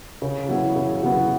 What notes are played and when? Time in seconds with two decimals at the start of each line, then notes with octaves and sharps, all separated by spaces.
0.22 C#3
0.49 F#3 B3 E4
0.76 C#3
1.02 F#3 B3 E4